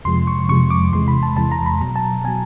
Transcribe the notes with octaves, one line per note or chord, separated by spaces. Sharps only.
F2 C3 F3 G#3 C6
C#6
F2 C3 F3 G#3 C#6
D6
E2 C3 E3 G#3 C6
B5
A5
E2 C3 E3 G#3 A5
A#5
B5
B2 F#3 A#5
A5
B2 F#3 G#5